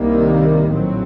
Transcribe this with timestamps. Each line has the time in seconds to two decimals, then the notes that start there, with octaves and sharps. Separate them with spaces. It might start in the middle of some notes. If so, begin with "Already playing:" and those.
Already playing: C2 C3 D#3 G3 A#3
0.68 A#1 A2 F#3 C4